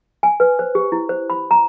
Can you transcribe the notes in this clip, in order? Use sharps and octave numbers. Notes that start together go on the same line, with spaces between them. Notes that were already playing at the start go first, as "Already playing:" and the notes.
G#5
B4
C5
G4
E4
C5
B5
A#5